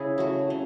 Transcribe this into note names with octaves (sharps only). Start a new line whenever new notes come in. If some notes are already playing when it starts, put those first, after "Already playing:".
Already playing: C#3 E4 G#4
F#3 A3
C#3